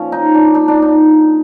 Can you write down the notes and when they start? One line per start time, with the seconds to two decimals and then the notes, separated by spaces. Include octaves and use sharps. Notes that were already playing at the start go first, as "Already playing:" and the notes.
Already playing: A#2 F3 C#4
0.12 D#4
0.34 D4
0.55 D#4
0.68 D4
0.82 D#4